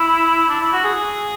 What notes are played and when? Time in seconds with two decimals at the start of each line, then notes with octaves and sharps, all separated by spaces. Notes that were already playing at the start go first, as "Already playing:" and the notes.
Already playing: E4
0.49 D4
0.61 E4
0.73 F#4
0.84 G#4